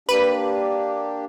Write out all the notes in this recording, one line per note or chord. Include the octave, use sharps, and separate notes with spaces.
A#3 D4 G4 B4